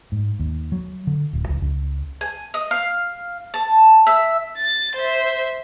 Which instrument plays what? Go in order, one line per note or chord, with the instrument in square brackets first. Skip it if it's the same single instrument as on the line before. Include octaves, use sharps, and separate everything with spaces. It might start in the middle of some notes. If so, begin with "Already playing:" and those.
[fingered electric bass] G#2
D#2
F#3
D3
D1
C#2
C#2
[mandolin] G#5
D#5
F5
A5
E5
[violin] A6
C5 E5